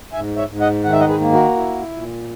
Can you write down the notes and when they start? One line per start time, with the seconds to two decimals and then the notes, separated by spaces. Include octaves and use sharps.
0.13 G#2 E5 G#5
0.37 C#5 E5
0.49 G#2
0.61 D#5 F#5
0.84 D#3 F#5
0.92 E5
1.00 D#5 F#5
1.08 G#4 B4
1.20 A#3
1.32 F#4 A#4
1.56 E4
1.92 A#2